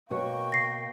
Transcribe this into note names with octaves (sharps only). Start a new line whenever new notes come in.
B2 A#3 F#4 C#5 G5 C#6
A#6 C7